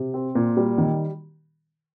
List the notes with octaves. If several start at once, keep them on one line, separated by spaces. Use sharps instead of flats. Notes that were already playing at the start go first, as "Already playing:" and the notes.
Already playing: C3
C4
A#2
G3
D#3